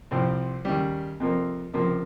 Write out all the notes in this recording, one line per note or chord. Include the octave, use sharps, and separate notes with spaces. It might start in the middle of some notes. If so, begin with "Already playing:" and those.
C2 C3 F3 C4
D#2 C#3 G3
F2 C3 F3 A#3
C#2 C3 F3 A#3